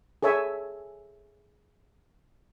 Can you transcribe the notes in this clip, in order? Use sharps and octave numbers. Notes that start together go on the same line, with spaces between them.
G#4 A4 C#5 E5 G#5